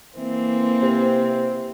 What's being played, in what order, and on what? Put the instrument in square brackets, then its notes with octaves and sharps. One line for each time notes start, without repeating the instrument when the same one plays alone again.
[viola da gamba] E3 A#3 C4
[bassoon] C3